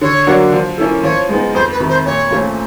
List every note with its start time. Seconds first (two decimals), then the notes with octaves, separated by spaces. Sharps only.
0.01 D3 C#5
0.27 F#3 A#3 D4 F#4
0.52 F3
0.78 A#3 C#4 E4 A4
1.03 F3 C#5
1.29 G#3 B3 D#4
1.55 F2 C5
1.72 B4
1.80 C3 D#3
1.89 C5
2.05 A#2 C#5
2.31 F3 A3 C#4 F4